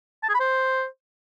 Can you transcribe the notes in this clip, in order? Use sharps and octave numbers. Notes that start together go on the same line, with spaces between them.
A5
G#4
B5
C5